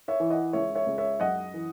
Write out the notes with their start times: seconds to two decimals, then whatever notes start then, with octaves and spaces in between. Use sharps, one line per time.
0.08 C#5 E5
0.20 E3
0.30 D#5 F#5
0.53 C#2 C#5 E5
0.75 C#5 E5
0.87 C#2
0.98 C#5 E5
1.20 F#2 D#5 F#5
1.54 E3